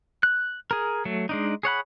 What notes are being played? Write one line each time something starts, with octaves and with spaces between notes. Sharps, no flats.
F#6
G#4 A#4
F#3 A3
G#3 D4 D#4
G#4 C#5 F#5 B5